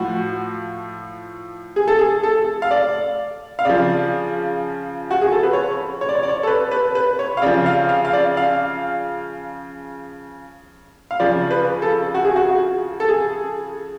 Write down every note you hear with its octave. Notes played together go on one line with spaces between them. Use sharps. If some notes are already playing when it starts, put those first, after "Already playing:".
Already playing: A2 F3 F#4
G#4
A4
G#4
A4
F5
D5
F5
C#3 F3 D5
F#4
G#4
A4
B4
C#5
C#5
D5
C#5
D5
C#5
A4
B4
B4
B4
C#5
F5
C#3 F3 D5
F5
F5
F5
D5
F5
F5
C#3 F3 D5
B4
A4
F#4
G#4
F#4
A4
G#4